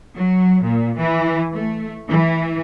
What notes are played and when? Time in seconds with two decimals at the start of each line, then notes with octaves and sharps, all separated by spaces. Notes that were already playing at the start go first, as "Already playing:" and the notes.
0.14 F#3
0.62 A#2
0.97 E3
1.53 A3
2.08 E3